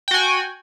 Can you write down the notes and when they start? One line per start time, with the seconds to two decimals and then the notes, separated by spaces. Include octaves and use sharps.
0.08 G5
0.11 F#4
0.14 G#5